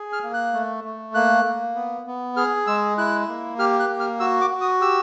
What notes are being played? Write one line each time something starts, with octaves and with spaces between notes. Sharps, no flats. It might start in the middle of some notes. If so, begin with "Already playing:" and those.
Already playing: G#4
F6
A#3
F#6
A3
A3
A#3 F#6
A#3
B3
B3
G#4 F6
G#3 E6
E4 F#6
A#3
G4 F6
F#6
A#3
F6
F#4 E6
D6
F#4
D#6
G4 E6